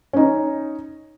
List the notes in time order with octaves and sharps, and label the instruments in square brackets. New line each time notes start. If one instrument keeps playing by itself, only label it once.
[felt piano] C#4 D#4